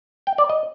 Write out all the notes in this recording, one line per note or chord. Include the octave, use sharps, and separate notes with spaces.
G5
D5
D#5